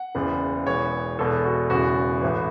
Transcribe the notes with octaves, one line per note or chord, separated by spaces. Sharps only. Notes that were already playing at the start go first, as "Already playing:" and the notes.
Already playing: F#5
F#1 E2 C#3
E1 E2 E3 C#5
E1 E2 B2 A4
F#4
E1 E2 C#3 F#4
A1 A2 E3